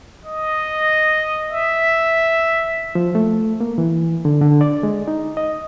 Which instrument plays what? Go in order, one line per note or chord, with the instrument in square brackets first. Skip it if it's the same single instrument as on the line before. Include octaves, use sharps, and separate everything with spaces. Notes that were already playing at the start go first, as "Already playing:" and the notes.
[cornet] D#5
E5
[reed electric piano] F3
A3
A#3
E3
D3
D3
D5
G#3
D#4
D#5